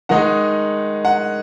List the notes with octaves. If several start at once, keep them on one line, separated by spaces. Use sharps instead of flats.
D#3 G#3 D#4 F#5
F#5